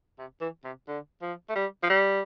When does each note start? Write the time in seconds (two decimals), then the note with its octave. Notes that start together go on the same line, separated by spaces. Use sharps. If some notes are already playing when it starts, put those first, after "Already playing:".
0.19 C3
0.41 E3
0.64 C3
0.88 D3
1.22 F3
1.49 A3
1.55 G3
1.83 F3
1.90 G3